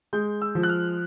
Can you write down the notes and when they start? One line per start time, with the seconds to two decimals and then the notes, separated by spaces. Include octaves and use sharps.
0.13 G#3 G6
0.42 E6
0.55 F3
0.63 F#6
0.69 F6